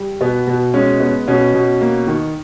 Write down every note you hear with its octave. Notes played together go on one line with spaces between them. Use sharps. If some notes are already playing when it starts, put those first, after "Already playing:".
Already playing: G3
B2 B3
B2
G#3 C#4
B3
B2 C#4
B2
A#3
D#3